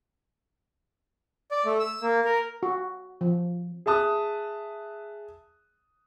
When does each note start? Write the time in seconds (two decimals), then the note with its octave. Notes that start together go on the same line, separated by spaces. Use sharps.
1.51 D5
1.66 A3
1.80 E6
2.02 A#3
2.25 A#4
2.63 F#4
3.21 F3
3.86 G#4 E5 A5 D#6 F#6